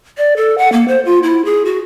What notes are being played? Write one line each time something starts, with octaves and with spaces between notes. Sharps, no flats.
D5
A4
F#5
A#3
C5
F4
E4
G#4
F#4